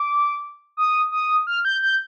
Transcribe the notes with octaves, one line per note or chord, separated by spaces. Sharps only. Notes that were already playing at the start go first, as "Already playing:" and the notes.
Already playing: D6
D#6
D#6
F6
G6
G6